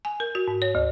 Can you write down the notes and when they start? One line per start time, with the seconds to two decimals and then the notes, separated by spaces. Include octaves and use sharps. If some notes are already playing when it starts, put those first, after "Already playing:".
0.05 G#5
0.20 A#4
0.35 F#4
0.48 G#2
0.62 C#5
0.75 D2